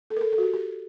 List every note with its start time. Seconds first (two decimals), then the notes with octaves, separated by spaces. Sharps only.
0.10 A4
0.16 A#4
0.21 A4
0.32 A4
0.38 F#4
0.43 G4
0.53 G4